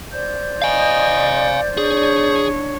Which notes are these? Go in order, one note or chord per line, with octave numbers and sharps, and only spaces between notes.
C5 D5 G6
D#5 F5 G#5
D4 G#4 C#5